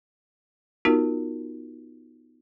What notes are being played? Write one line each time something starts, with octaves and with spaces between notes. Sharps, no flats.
B3 D#4 F4 F#4 A#4